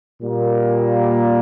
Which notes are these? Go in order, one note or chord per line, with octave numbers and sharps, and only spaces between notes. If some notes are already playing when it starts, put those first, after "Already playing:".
A#2 G3 A#3